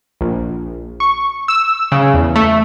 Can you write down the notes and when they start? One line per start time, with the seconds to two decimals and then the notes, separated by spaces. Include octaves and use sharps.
0.21 A#1
1.00 C#6
1.48 E6
1.92 C#3
2.14 E2
2.36 A3